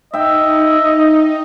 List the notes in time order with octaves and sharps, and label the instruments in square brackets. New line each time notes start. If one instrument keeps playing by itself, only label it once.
[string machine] D#4 [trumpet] D#5 [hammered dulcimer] E5 G5